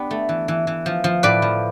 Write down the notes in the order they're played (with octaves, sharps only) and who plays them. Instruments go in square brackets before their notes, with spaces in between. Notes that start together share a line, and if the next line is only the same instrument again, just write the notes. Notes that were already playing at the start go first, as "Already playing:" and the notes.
Already playing: [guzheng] B3 D4 G4
A3
E3
E3
E3
F3
F3
A2 B4 D5
F3